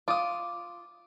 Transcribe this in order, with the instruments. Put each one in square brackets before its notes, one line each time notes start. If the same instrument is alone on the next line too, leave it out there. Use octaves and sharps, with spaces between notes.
[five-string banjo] F4 [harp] D6 D#6